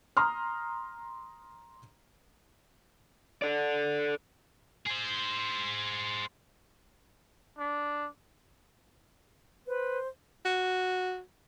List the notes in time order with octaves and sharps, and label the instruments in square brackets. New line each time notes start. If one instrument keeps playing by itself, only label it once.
[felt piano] A#5 C6 D#6 F6
[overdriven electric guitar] A4 D5
[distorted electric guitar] G#4 C5
[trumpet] D4
[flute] B4 [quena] C5
[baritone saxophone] F#4